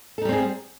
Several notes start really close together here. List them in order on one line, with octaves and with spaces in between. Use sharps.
A4 D#4 G3 C4 G#4